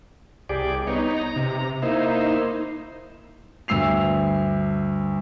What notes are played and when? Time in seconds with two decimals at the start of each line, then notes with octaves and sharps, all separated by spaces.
0.49 C2 G4 G#4 D5
0.87 B3 D#4 C#5
1.17 A#5
1.36 C3
1.83 A#3 D#4 E4 C5
3.68 D2 G2 E6 C7 F7